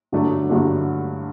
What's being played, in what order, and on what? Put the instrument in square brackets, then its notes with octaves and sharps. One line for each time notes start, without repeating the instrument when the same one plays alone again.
[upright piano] G2 D3 F#3 A3 D4
G2 D3 F#3 A3 D4